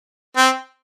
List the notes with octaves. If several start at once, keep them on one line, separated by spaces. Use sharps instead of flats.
C4